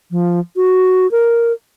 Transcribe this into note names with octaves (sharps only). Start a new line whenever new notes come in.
F3
F#4
A#4